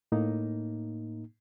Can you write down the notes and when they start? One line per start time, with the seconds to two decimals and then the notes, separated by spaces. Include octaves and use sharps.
0.12 A2 A#3 D#4